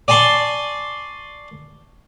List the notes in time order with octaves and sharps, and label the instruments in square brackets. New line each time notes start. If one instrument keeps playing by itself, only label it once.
[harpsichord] D5 G#5 A5 C6 C#6